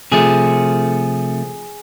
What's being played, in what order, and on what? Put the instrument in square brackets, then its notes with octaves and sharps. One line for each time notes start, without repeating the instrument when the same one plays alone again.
[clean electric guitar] C3 F3 A3 G#4